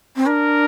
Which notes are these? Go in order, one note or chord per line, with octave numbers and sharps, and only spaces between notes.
C4
D4 A#4